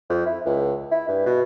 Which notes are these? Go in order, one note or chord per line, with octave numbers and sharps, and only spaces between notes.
F2
E4
C#2
E4
G2
B2